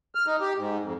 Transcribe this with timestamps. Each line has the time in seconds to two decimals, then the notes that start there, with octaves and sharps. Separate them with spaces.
0.15 F6
0.27 D#4
0.40 G4
0.57 G#2
0.82 F2